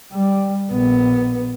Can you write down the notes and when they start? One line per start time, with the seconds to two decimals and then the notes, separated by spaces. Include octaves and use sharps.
0.12 G3
0.71 A#1 B3